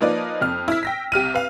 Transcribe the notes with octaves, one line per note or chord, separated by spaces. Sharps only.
F3 A#3 D#4 B4 D5
F2 F6
E4 E6 B6
G5 A#6 B6
C2 G4 F6 D#7
B4 F5